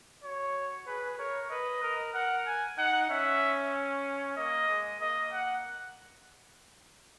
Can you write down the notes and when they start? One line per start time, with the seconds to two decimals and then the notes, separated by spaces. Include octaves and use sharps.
0.23 F#4 C#5
0.87 G#4 B4
1.19 A#4 C#5
1.51 B4 D#5
1.83 A#4
2.14 A#4 F#5
2.47 G#5
2.78 D#4 F#5
3.10 C#4 E5
4.37 A#3 D#5
4.69 G#3
5.00 A#3 D#5
5.33 F#5